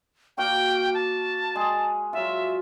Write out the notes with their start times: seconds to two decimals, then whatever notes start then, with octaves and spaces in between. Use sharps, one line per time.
0.38 A#3 F#4 F5 G5
0.94 A5
1.55 G#3 G#4
2.13 F#3 F4 E5